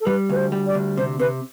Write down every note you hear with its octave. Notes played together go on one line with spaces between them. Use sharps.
A4
G3 B4
D2 B4
C5
G3
D5
D2
C3 C5
C3 B4